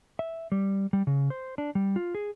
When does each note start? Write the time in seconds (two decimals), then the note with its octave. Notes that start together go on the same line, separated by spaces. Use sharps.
0.19 E5
0.52 G3
0.93 G3
1.07 C#3
1.30 C5
1.58 D4
1.75 G3
1.96 F4
2.15 G#4